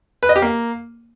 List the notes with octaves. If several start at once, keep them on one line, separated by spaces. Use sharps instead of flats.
B4
D#5
G4
A#3